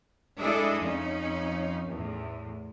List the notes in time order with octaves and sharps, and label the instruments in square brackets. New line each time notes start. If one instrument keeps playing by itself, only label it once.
[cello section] G#3 D4 E4 G#4 A4 D#5
F2 C#4 D#4
E2 A2